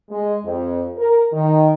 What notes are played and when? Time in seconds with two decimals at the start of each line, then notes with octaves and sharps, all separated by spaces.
0.11 G#3
0.44 F2
0.98 A#4
1.33 D#3